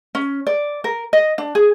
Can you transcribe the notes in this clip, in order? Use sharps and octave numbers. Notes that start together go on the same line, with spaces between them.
C#4
D5
A#4
D#5
D4
G#4